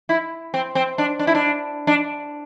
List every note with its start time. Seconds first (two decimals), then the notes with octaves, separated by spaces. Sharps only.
0.09 E4
0.54 C4
0.75 C4
0.98 D4
1.19 D4
1.27 E4
1.35 D4
1.87 D4